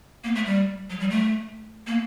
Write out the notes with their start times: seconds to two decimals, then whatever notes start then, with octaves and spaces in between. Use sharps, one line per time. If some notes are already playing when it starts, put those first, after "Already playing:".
0.24 A#3
0.35 A3
0.46 G3
0.90 F#3
1.00 G3
1.11 A3
1.87 A#3